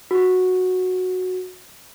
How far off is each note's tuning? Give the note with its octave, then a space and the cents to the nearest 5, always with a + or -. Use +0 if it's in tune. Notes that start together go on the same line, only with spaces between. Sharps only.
F#4 -10